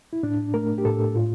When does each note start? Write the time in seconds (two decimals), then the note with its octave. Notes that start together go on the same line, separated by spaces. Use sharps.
0.13 E4
0.23 A2 D4
0.54 A3 A#4
0.78 G4
0.85 A2 A4
1.15 A2 F4